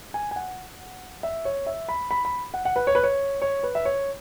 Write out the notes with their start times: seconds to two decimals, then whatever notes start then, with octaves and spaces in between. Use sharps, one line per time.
0.14 G#5
0.31 G#5
0.36 F#5
1.23 E5
1.45 C#5
1.67 E5
1.89 B5
2.11 B5
2.25 B5
2.54 F#5
2.65 F#5
2.76 B4
2.87 C#5
2.95 B4
3.03 C#5
3.42 C#5
3.63 B4
3.75 E5
3.85 C#5